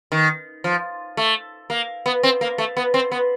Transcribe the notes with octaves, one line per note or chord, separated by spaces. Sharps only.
D#3
F3
A3
A#3
B3
C4
A#3
A3
B3
C4
B3